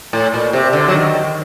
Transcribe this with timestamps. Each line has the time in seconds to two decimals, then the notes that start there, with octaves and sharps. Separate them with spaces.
0.13 A2
0.34 A#2
0.53 C3
0.73 D3
0.88 F#3
0.92 D#3